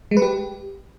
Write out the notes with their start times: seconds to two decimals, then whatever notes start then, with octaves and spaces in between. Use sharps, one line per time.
0.11 G#3
0.17 B4
0.22 G4